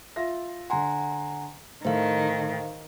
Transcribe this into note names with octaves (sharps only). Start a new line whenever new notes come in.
F4 E5 A#6
D3 F#5 G#5 A#5 C6
A2 D#3 A4 C5 F5